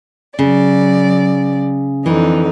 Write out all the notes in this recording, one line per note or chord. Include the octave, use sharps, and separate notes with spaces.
C#3 F#3 D5
F2 D3 E3 D#4